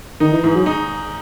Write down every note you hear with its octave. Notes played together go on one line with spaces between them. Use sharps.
D#3 D#4
E3
G#2 E3
F#3
D#4